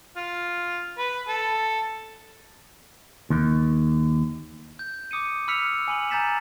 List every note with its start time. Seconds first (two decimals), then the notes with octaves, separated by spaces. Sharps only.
0.17 F4
0.98 B4
1.28 A4
3.30 D#2
4.79 G6
5.11 D6 D#6 C#7 D#7
5.48 B5 E6 F6 B6 C#7 F7
5.88 G#5 B5 F#7
6.10 G#5 A#5 G6 A6 B6 E7